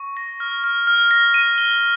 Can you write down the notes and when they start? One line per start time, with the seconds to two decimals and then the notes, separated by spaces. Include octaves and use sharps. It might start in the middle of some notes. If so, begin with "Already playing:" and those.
Already playing: C#6
0.17 A#6
0.40 F6
0.64 F6
0.87 F6
1.11 A#6
1.34 D#7
1.58 G7